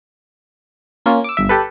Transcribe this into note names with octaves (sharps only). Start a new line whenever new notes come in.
A#3 C#4 F4
D6 E6
G1 E5
G4 A4 B4